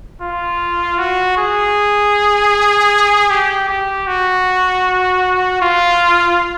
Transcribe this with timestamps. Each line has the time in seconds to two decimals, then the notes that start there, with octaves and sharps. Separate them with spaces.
0.22 F4
0.99 F#4
1.38 G#4
3.30 G4
3.69 G4
4.07 F#4
5.62 F4